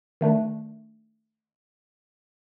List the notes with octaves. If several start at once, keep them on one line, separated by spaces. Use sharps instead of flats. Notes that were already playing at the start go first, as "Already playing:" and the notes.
D#3 A3 D4